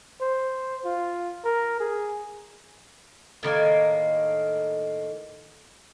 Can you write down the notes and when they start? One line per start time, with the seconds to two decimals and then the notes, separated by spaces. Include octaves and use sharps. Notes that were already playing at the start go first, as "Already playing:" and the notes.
0.21 C5
0.85 F4
1.45 A#4
1.80 G#4
3.43 A2 D#3 A#3 G#5